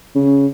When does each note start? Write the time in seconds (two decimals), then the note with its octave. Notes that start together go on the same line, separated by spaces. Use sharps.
0.15 C#3